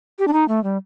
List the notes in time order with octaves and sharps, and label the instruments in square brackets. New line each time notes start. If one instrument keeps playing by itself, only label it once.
[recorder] G4
D4
D#4
A3
G3